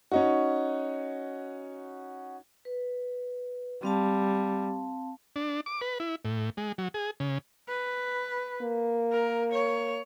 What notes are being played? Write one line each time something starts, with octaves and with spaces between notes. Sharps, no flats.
C#4 D#4 F#4
B4
G3 C4 F5 A5
D4
D6
B4
E4
A2
G#3
F#3
G#4
C#3
B4
A#3
A#4
C#5